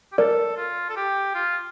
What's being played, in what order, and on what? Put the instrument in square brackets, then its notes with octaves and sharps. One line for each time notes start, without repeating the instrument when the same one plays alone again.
[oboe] G4
[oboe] A4 [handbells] A#4 D5
[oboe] F4
A4
G4
F4